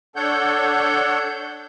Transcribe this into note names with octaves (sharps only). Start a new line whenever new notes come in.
D4 A4 C#5 F#5 G6